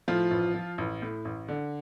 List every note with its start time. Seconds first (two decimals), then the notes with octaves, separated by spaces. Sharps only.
0.08 A2 F3 F4
0.31 A1
0.55 F3
0.78 A1
1.02 A2
1.25 A1
1.48 D3